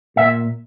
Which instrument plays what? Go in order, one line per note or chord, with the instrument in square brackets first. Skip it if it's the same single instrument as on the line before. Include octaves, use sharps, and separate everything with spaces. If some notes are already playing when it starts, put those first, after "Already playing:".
[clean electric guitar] A#2 E5